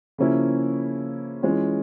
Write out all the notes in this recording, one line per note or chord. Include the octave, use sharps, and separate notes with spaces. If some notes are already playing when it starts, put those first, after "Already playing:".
C#3 F3 A#3 C#4 E4
E3 G#3 C#4 F4